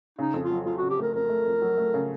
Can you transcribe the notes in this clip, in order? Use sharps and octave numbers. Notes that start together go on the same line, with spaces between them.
C#3 D#4
F2
F4
F#3
F#3 F4
F#4
C#3
G4
A3 A#4
F2 A#4
A3
F2
F#3
A3
C#3